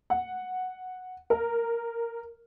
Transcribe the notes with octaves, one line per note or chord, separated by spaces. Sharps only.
F#5
A#4